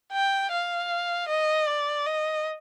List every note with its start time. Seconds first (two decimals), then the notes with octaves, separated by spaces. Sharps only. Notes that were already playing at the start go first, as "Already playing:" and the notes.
0.12 G5
0.52 F5
1.28 D#5
1.67 D5
2.06 D#5